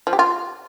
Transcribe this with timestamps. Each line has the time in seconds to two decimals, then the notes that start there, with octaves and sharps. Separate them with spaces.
0.07 F3
0.13 G4
0.19 F4